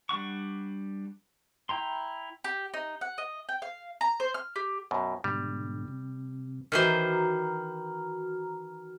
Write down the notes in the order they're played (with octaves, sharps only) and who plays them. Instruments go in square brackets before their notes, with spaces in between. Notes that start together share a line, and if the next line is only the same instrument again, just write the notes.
[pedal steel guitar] G3 D4 F#5 C#6
E4 G5 A#5 C6
[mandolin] G4
D#4
F#5
D#5
G5
F5
A#5
C5
F6
G4
[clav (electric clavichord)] F#2 B2
[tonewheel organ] G#2 B2 D3 [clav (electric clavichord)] G3
[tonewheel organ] C3
[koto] D#3 E3 C5 [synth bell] F#4 A#5 F6